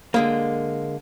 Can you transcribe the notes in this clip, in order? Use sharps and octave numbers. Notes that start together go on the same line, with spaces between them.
D3 G#3 A#3